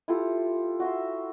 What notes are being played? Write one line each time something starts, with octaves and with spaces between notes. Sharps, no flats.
E4 F4 G4 A4
F#4 E5 C6